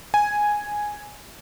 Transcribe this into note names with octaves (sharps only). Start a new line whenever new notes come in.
G#5